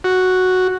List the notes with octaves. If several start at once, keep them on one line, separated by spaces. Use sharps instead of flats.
F#4